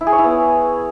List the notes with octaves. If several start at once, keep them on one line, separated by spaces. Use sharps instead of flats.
E4
G#4
C#5
E4
B3